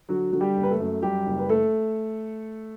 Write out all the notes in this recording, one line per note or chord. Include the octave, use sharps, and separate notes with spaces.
D3 F#3 F#4
D3 F#4
G3 G4
F#1
B4
A3 A4
F#2
F#2 G3 G4
F#1
B4
A3 A4